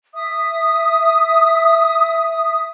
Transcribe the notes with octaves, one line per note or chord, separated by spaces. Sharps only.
E5 D#6